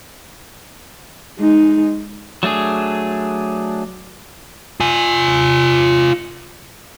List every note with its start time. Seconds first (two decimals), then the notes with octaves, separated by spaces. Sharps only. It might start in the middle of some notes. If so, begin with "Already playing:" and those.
1.39 G#3 D#4
2.43 F#3 A3 D4 G#4
4.80 F4 G#5